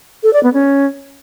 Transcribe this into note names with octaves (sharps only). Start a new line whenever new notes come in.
A4
D5
B3
C#4